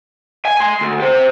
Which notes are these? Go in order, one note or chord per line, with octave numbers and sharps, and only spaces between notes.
G#5
G#5 C6
D2
G4 C5